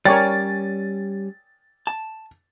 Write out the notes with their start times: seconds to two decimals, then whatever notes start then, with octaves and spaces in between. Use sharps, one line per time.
0.05 G3 C#4 A#4 C#5 D5 G5 G#5 A6
1.87 A5